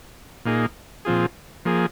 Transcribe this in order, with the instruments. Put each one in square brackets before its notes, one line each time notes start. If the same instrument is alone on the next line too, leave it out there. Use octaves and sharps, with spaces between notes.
[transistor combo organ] A#2 A#3 D#4 G#4
A#2 F3 C4 F4 G#4
F3 A#3 G#4